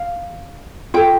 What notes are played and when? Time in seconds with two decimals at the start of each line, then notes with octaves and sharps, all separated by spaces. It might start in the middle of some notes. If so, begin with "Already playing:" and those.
Already playing: F5
0.94 F4 A4 G5